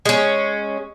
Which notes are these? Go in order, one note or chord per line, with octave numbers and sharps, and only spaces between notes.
G#3 C#4